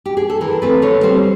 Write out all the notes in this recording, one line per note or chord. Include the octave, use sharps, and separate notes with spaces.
G4
G#4
A4
E3 A#4
A3 C4 B4
D3 C#5
G3 C4 C5